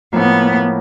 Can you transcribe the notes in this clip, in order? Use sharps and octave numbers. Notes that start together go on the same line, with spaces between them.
A2 F3 A#3 B3